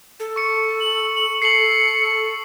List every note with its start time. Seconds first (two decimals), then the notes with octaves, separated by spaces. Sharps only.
0.20 A4
0.36 C#6 C#7
0.80 F#7
1.15 F#7
1.42 A4 C7 C#7 F#7